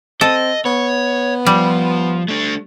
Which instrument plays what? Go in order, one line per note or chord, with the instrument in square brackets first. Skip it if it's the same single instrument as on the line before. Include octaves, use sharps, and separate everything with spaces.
[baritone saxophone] C4 [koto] A4 [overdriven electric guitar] D#5
[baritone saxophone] B3 [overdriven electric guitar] C#5
[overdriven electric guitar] F3 [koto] G3
[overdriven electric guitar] A3 D4